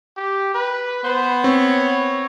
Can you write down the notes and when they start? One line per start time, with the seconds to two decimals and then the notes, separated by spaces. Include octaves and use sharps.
0.17 G4
0.55 B4
1.04 B3 C5
1.44 C4 C#5